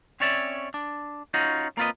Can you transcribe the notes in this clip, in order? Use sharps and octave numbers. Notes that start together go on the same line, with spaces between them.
C4 C#4 C#5 D5 E5
D4
C#4 D#4 F4 F#4
A#3 C4 F4 B4 D#5